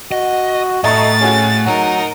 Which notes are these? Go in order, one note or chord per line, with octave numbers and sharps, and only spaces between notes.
F#4 D#5
A2 A3 D#5 A#5 C#6 A6
C#4 F#4 G#4
F#3 D#4 A#4